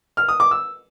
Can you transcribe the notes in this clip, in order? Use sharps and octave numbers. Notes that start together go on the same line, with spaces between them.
F6
D#6
D6
E6